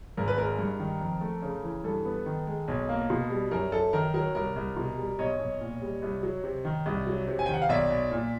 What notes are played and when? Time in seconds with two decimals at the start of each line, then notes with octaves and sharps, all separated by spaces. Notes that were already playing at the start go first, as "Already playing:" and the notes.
0.17 G#1 A#4
0.28 B4
0.38 G#3 A#4
0.59 G2
0.80 D#3
1.01 F2
1.21 A3
1.43 C#3
1.64 E3
1.84 G2 A4
2.05 B3
2.26 D#3
2.47 G#3
2.68 B1
2.89 A#3
3.10 B2
3.30 G3
3.51 F#2 A#4
3.72 F#2 A4
3.93 D#3 A#4
4.14 F#3 A#4
4.35 C2 A#4
4.56 C2
4.77 B2
4.97 G3
5.19 B1 C#5 D#5
5.39 B1
5.60 A#2
5.82 G3
6.02 C2
6.23 F#3
6.44 C3
6.65 D#3
6.86 C2
7.07 F#3
7.28 C3
7.39 G#5
7.46 D#3 G5
7.54 F#5
7.62 F5
7.69 B1 D5 E5
7.90 B1
8.11 A#2